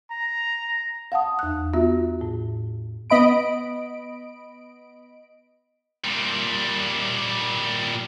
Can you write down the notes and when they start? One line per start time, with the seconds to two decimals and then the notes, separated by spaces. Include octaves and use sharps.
0.11 A#5
1.12 F5 F#5 A5 D#6
1.39 E2 F#6
1.73 B3 F4 F#4 E5
2.21 A2
3.10 B3 D#5 B5 D7
6.04 A#2 G3